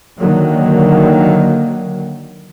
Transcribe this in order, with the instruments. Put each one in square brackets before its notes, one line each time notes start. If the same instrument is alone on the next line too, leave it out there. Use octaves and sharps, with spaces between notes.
[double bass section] D3 D#3 F#3 A#3